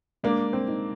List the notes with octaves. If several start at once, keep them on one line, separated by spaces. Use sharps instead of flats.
G#3 A#3 D4
C4
D#4